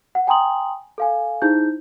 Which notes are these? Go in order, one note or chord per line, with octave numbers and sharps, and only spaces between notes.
F#5
G5 G#5 A#5 C6 D#6 F#7
A4 F5 G#5
D#4 E4 G#4 C5 G6